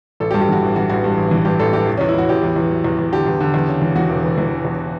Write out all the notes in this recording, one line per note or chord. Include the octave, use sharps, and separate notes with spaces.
A1 A4
G4
G2
G4
E3 F#4
A1
E3 F#4
A1 F#4
G2
A1
E3
G2 G4
A1 A4
E3 G4
E2
E2 C#4
E4
E2 F#4
E2 G4
E2
E2
F#3
E2
E2
D3 G4
E2
D3
E2
C#3
E3
E3 F#4
E1
E1
E3
E1
E2